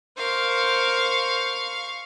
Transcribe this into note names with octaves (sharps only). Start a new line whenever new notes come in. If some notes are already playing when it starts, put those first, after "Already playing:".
A#4 C5 F5 C#6